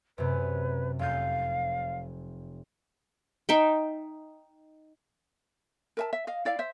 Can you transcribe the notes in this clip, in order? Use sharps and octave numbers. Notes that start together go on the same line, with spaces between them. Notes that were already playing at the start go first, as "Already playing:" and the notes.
F#2 C3 B4
F1 F5 G6
D#4 E5 G5
A#4 E5 A5
E5
D#5 F5
E4 D5 F5
C5 E5